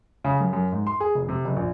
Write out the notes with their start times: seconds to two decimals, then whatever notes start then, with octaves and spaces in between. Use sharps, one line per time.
0.24 C#3
0.40 F#2
0.53 F#2
0.72 G#2
0.87 C6
1.00 G#4
1.15 F1
1.29 C3
1.45 F#1
1.56 A#1